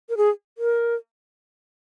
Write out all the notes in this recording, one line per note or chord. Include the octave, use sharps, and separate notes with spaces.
A#4
G#4
A#4